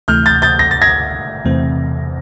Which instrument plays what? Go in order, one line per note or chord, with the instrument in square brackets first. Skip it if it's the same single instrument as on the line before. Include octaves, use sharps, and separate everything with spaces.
[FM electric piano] D2 C3 E3 A3 [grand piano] F6 G6
[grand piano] G6 A6
G6 A6
A#6
A6
G#6 A#6
[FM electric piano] E2 C3 E3 A3 C4